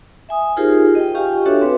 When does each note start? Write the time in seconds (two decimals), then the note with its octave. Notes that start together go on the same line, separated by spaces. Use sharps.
0.29 E5 G#5 D#6
0.57 D#4 F4 G4 G#4 A#4 C5
0.95 D#5 G5
1.14 F4 G4 F5 G5 G#5 C#6
1.46 D4 F#4 A4 C#5 E5
1.62 C4 B4